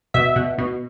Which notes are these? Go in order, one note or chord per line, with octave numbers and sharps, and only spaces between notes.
B2 E5
B2
B2